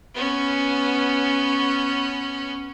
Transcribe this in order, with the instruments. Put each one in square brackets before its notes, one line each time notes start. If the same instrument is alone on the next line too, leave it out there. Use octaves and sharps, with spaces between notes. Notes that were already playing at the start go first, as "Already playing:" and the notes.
[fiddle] B3 C#4